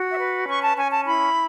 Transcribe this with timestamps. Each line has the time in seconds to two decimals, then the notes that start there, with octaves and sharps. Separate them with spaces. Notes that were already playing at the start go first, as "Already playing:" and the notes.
Already playing: F#4
0.11 E5
0.19 B4
0.48 C#4 C#6
0.62 A5
0.76 C#4 G#5
0.90 A5
1.05 E4 B5